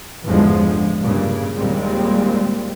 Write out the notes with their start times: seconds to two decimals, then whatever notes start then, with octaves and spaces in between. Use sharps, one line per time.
0.24 A1 E2 G2 D3 F3 G#3
1.01 G2 A#2 C#3
1.56 D#2 A#2 G3 G#3 C4